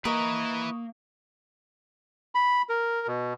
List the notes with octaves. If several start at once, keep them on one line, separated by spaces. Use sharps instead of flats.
A#3 E4 A#4 B4 D#5 A#5 C#6 D#6
B5
A#4
B2